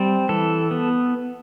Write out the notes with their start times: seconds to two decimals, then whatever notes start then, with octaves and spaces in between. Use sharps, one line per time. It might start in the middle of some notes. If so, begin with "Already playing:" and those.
Already playing: G3 C4
0.29 E3 A4
0.71 B3